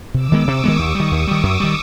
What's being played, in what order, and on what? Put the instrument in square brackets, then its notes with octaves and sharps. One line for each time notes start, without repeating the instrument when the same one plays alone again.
[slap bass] C3 [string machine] D6 E6
[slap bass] D#3 G#3 B3
[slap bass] C3 [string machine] C#6 D#6
[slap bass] D#3 G#3 B3
[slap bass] D#2 [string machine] C#6 D#6
[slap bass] D#3 G3
[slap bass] D#2 [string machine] D6 E6
[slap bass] D#3 G3
F#2
D#3 G3